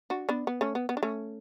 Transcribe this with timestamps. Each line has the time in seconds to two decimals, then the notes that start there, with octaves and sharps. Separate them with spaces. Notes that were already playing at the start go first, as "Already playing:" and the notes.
0.10 D4 F#4
0.29 B3 D4
0.47 B3
0.61 A3 C#4
0.75 B3
0.89 B3
0.97 D4
1.03 A3 C#4